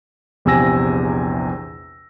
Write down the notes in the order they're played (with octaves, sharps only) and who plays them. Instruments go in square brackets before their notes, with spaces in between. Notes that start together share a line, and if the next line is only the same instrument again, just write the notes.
[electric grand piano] A#1 E2 C3 G#5 E6 A#6